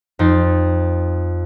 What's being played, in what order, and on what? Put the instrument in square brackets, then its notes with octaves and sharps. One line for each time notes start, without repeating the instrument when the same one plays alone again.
[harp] F2 D#4 F4 A6